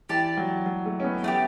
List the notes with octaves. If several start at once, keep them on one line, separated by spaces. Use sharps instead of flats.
E3 G4 D5 A5
F#3
F#3
A3
C#4
B3
A3 B3 E4 G4